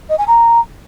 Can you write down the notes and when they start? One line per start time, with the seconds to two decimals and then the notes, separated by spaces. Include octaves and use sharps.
0.09 D#5
0.18 G#5
0.27 A#5